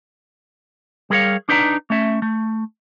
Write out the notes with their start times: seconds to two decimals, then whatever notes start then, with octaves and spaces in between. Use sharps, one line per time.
1.10 G3 G#4 A#4 B4 C#5 F5
1.49 D4 D#4 B4 D5 A5 A#5
1.90 A3 C#4 E5
2.22 A3